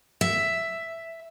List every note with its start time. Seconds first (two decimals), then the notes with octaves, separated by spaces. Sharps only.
0.21 E5